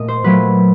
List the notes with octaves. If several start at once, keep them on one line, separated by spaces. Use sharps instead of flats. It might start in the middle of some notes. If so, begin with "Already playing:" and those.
Already playing: A#2 A3 D#5
C5
A#2 F#3 A3 B4